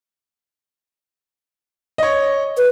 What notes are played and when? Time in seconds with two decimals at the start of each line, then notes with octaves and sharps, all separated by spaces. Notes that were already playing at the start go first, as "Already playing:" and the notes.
1.98 C#5 D#5
2.57 B4